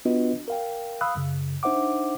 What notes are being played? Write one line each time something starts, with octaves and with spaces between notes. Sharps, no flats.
B3 D4 F4 F#4 B4 D#5
A#4 F5 G5
F5 B5 D#6 E6 F#6
F#2 C#3
D4 D#4 C5 E5 F#5 D6